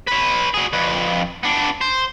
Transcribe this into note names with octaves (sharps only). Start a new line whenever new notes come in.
B4 C#5
F#3 G#4
F2 B4
B3 D4
C5